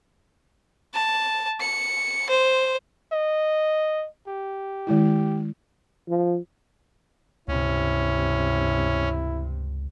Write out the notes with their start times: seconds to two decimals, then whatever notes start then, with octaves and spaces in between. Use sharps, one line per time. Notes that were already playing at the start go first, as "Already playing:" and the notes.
0.94 A5
1.60 C#7
2.29 C5
3.12 D#5
4.27 G4
4.87 D#3 G#3 E4
6.09 F3
7.48 C#2 G2 C3 C#4 E4